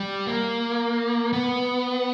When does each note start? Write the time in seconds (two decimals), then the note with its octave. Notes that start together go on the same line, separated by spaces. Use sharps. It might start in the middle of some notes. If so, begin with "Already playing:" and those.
Already playing: G3
0.26 A#3
1.33 B3